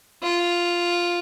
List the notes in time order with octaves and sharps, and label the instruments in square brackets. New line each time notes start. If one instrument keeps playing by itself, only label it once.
[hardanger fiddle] F4